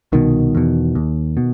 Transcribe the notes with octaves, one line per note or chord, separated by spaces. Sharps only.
C2 B2 D#3
E2 B2
D#2
B2